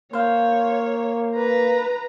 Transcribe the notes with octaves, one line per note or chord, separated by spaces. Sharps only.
A#3 C5 C#5 F5
B4 A#5